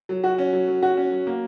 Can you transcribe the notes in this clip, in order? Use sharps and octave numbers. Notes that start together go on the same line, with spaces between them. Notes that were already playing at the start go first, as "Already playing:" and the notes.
F#3
F#4
C#4
F#3
F#3
F#4
C#4
F#3
A#3